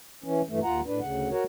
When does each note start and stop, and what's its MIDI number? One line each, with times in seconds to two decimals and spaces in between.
0.24 0.41 52
0.24 0.41 61
0.49 0.60 43
0.49 0.60 52
0.49 0.60 57
0.64 0.81 39
0.64 0.81 65
0.64 0.81 78
0.64 0.81 82
0.86 0.99 45
0.86 0.99 62
0.86 0.99 71
1.01 1.29 38
1.01 1.29 49
1.01 1.29 78
1.31 1.44 66
1.31 1.44 70
1.31 1.44 73